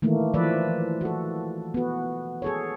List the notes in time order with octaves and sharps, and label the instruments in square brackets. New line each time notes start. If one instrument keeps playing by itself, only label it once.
[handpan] D#3 E3 A3 A#3
E3 F3 B4 D5 E5
F#4 A4
B3 F#4
G#4 A4 C#5